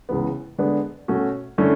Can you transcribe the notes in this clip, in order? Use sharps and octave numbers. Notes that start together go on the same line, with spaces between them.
C#2 C#3 E3 B3
D3 G#3 B3 D4
B2 A3 C#4 F#4
D3 A3 C#4 E4